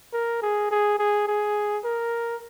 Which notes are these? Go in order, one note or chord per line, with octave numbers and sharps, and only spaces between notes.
A#4
G#4
G#4
G#4
G#4
A#4